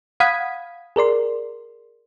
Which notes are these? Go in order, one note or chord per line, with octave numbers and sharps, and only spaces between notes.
F5 F#5 B5 D#6 G#6 B6
G#4 A#4 D5 C6